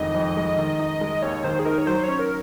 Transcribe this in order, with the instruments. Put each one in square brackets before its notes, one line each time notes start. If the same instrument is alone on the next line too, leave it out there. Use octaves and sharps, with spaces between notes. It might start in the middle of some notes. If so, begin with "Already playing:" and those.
Already playing: [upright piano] F1 F2 D#3 G#3 [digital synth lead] D#5
[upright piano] F2
G#3
D#3
D#4
G#3
[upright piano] D#2 [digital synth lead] C#5
[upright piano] D#3 [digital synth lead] C5
[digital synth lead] G#4
[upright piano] D#4 [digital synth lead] A#4
[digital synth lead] C#5
[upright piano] F#3 [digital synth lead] C5
[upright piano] C#4 [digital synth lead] C#5
[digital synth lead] A#4